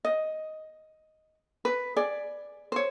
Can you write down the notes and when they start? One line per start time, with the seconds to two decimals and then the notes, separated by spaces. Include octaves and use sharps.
0.05 D#5
1.65 B4
1.96 G#4 D5
2.72 C5 C#5